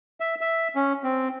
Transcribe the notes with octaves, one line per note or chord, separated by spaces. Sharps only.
E5
E5
C#4
C4